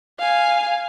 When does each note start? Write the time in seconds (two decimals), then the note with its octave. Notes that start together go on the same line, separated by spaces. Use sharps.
0.19 F5 G#5